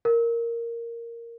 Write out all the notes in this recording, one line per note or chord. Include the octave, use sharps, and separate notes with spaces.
A#4